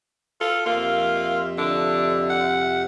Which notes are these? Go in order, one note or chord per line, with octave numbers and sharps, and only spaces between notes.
F4 A4
F2 C3 A#3 F4 E5
D3 D4
F#5